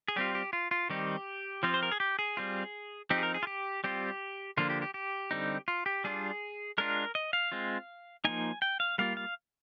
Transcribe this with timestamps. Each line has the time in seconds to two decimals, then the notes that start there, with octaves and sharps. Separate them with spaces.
0.08 G#4
0.16 G3 C4 F4 G4
0.35 G4
0.53 F4
0.71 F4
0.90 D#3 G3 C4 D#4 G4
1.63 F3 C4 F4
1.74 C5
1.83 A#4
1.92 G#4
2.00 G4
2.19 G#4
2.37 G3 C4 F4
3.10 F3 C4 D#4 G4
3.18 G#4
3.23 A#4
3.34 G#4
3.43 F4
3.47 G4
3.84 G3 C4 F4 G4
4.57 D3 F3 A#3 D4 F4
4.70 G4
4.82 G4
4.94 G4
5.31 D3 G3 C4 D#4
5.68 F4
5.86 G4
6.04 G3 D4 F4 G#4
6.78 G#3 D4 F4 A#4
7.15 D#5
7.33 F5
7.52 G#3 C4 F4
8.25 F3 A#3 D#4 G#5
8.62 G5
8.80 F5
8.98 G3 A#3 F4 F5
9.17 F5